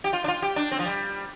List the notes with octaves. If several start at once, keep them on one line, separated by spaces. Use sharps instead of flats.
G4
F4
D4
F4
G4
D4
C4
F3
G3